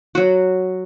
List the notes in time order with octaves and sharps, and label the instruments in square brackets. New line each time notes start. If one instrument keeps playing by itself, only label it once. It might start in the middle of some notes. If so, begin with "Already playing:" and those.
[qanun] F#3 F#4